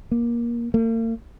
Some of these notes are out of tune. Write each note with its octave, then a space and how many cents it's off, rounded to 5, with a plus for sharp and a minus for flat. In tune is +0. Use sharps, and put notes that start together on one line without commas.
A#3 +20
A#3 -45